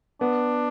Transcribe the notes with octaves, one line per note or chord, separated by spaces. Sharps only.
B3 D4